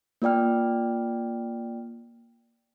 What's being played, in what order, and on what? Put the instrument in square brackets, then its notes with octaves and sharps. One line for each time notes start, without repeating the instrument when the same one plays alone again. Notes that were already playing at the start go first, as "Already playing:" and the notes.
[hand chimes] A#3 F4 D5 G5 F6